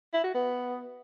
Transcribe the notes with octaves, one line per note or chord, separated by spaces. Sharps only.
E4
F#4
B3